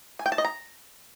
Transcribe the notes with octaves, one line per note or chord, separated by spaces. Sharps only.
G#5
G5
A5
D#5
A#5